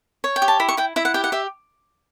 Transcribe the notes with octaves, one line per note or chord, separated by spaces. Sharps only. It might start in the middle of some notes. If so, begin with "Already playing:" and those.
C#5
G5
G4
A5
E4 B5
C#6
E4 G5
E4 E5
F#5
G4 G5
F#5
G4 E5